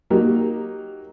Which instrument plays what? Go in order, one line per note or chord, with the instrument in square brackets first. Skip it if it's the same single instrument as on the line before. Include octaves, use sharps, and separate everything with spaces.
[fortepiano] F#3 A#3 D#4 G4